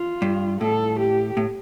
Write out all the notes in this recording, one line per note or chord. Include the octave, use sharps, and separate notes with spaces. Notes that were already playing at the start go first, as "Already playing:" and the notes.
Already playing: F4
G2
A2 A4
G4
A2